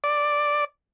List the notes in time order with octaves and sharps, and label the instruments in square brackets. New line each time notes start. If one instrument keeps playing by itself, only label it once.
[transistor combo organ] D5